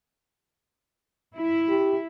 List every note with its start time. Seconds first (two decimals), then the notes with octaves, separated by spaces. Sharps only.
1.36 E4
1.69 G4